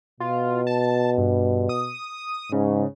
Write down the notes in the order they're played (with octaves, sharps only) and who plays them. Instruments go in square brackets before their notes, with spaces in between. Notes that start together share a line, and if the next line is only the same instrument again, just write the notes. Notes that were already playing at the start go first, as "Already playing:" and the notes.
[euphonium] B2 [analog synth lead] F4
[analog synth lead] A5
G2
D#6
[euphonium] G#2 [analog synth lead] C#3